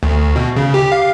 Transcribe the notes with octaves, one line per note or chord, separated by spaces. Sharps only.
D2
B2
C#3
G4
F5